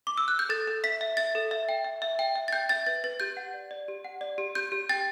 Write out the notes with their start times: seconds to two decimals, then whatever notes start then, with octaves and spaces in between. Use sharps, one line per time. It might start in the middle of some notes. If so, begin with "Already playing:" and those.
0.07 D6
0.18 E6
0.28 F#6
0.39 G6
0.49 A4 A6
0.67 A4
0.84 E5 B6
1.01 E5
1.17 E5 A6
1.35 A4
1.51 E5
1.69 G5
1.84 E5
2.02 E5
2.19 G5
2.36 E5
2.48 A6
2.52 G5 G6
2.69 E5 A6
2.86 B4 A6
3.04 B4 A6
3.20 G4 G6
3.37 F#5
3.54 D5
3.71 D5
3.88 G4
4.04 F#5
4.21 D5
4.38 G4
4.55 G4 G6
4.72 G4
4.89 G5 A6